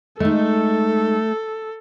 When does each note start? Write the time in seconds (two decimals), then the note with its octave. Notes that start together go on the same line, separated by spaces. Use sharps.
0.20 G#3 A3 D#4 A4